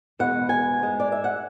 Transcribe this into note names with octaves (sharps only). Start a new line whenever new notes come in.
E2 B2 G#3 F#5
G#5
G#2 G#3
D5
E5
F#5